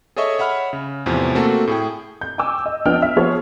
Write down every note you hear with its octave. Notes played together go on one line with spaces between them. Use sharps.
G#4 A4 C#5 D#5 E5 C#6
C#5 E5 F#5 B5 F6
C#3
E2 A2 C3 F3
A3 A#3 C4 F#4 A4
A2 G#4 G5
G6
G5 G#5 C#6 D6 E6
D#5
F3 B3 D4 D#5 G5 F6
E5
F3 B3 G#4 C5 C#5